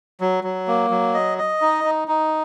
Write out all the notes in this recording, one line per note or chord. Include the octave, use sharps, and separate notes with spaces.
F#3
F#3
A#3
F#3
D#5
D#5
D#4
D#4
D#4